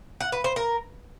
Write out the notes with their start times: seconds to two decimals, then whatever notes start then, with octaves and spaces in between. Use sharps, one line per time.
0.20 F#5
0.32 B4
0.44 C5
0.56 A#4